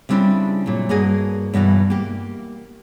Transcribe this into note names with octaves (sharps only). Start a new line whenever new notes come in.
C#3 G3 C4 D4 E4
A#2 F#3
G2 A#3 F#4 G#4 D#5
G2 B2 D3 E3
A#3 G4